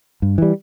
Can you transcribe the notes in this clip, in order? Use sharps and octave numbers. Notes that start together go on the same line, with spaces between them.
G2
E3 G3